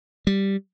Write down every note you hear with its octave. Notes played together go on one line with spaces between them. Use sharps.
G3